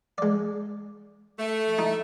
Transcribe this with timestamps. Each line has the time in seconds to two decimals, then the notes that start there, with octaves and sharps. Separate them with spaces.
0.18 G#3 D5
1.39 A3
1.78 D#4 E4